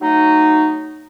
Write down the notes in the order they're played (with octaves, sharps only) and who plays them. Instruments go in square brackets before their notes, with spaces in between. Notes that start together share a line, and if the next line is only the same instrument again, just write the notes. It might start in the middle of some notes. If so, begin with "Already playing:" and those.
[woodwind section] F#3 A3 D#4